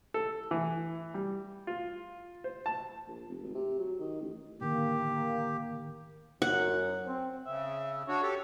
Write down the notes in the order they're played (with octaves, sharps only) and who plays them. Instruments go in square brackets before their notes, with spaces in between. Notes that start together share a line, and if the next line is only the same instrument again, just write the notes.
[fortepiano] A4
E3
G3
F4
C5
A5
[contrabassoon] A#1
F1
G#1
C3
F#3
D#3
A1
[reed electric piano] A2 D3 D#3 [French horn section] A#3 [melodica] G4
[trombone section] F#2 [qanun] F#5
[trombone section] C4
[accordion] C#3 [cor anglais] E5
[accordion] D4 F#4 [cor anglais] C#5
[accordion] G4 A4